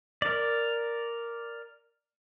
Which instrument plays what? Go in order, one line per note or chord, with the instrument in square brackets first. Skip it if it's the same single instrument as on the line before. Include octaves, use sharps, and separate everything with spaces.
[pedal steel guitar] A#4 D5